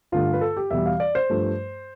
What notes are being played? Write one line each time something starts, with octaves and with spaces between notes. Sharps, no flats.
G2 D3 A3 F4
B4
A4
G4
E2 B2 G3 E5
F5
D5
C5
G2 F3 A3